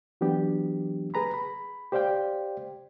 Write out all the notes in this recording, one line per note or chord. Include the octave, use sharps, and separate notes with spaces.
E3 F#3 B3 D4 G4
G#4 B4 A#5 B5
B5
G4 C5 D5 F5 G5